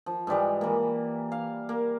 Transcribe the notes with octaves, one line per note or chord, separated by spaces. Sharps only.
F3
G#2 E3 G3 G#3
E3 A#3
F5
A#3